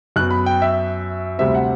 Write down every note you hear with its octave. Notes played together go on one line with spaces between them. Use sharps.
F#2 F#3 B3 F#6
B5
G5
E5
D2 C3 G3 C4 E5
F#5